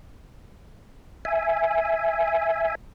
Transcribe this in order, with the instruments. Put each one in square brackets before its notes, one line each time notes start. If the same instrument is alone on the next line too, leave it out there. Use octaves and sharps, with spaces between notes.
[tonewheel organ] E5 G#5